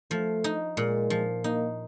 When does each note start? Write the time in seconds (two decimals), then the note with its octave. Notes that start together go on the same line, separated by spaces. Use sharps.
0.11 F3 A3
0.44 D#4
0.77 A#2 G#3
1.10 F3
1.44 A#3 D#4